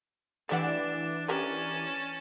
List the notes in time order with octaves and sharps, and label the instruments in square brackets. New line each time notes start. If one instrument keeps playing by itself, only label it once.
[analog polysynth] E3 D5 E7 [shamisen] A3 G4 F#5 [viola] D4
[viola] C#4 A5 [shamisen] G4 A#4 B4